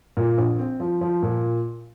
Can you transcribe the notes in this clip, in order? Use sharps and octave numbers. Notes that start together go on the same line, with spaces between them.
A#2
A#1
C4
F3
F3
A#2